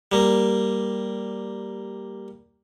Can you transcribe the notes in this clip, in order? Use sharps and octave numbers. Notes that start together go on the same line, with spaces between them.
G3 A#3